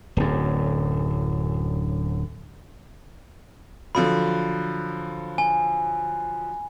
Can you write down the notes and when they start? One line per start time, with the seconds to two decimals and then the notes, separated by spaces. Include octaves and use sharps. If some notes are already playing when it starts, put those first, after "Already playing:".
0.17 D1 F#2
3.95 D3 F3 F#3 B5
5.38 G#5